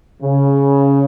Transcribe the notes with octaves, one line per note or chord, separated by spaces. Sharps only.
C#3